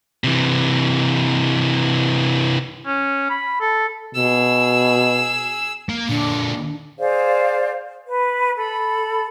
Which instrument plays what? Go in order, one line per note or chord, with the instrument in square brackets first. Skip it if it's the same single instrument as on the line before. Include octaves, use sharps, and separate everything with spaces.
[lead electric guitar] C3 E3
[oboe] C#4
B5
A4
[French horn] B2 [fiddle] G#4 E6
[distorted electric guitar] A#3
[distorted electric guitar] A#2 D3 [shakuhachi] D4
[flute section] G#4 C5 D5 F5
B4
A4 B5